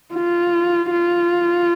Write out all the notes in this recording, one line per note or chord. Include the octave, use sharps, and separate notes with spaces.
F4
F4